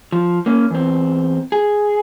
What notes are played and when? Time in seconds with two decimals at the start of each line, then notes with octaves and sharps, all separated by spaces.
0.12 F3
0.46 A#3 C#4
0.71 E2 C4
1.52 G#4